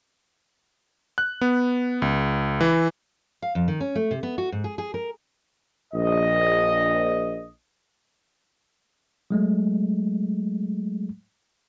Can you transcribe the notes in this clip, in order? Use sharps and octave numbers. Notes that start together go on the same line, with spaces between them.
F#6
B3
C#2
E3
F5
F2
D#3
C#4
A3
C3
B3
F#4
G#2
G#4
G#4
A#4
A#1 D#5
F#3 G#3 A3